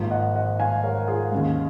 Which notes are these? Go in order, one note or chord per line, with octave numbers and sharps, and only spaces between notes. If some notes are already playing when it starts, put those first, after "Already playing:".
Already playing: G#1 G#2 F3 A#3
D#5 F#5
D#5 F#5
F5 G#5
A#4 C#5
F4 G#4
D#2 C#3 G#3